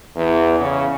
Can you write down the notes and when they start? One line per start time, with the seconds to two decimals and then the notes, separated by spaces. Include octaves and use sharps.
0.16 E2
0.60 C#3